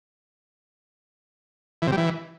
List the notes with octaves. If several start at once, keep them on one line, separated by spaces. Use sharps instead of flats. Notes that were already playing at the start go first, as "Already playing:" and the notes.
E3
C3
G3
E3